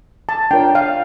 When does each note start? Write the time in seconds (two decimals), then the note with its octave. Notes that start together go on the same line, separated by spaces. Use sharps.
0.29 A5
0.51 D4 F4 A#4 C#5 G5
0.75 F5